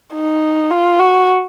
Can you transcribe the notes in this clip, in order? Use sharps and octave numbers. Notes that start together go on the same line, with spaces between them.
D#4
F4
F#4